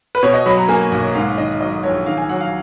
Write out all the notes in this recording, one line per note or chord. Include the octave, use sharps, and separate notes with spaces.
B4
B2 C#5
D#5
F#3 B5
A#5
A#3 G#5
B1
G#2 F5
D#3 D#5
F#3 D#5
A#1 C#5
D#3 F5
G#5
F#3 F#5
F5